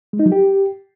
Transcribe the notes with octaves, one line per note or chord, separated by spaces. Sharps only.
G#3
D#4
F#3
G4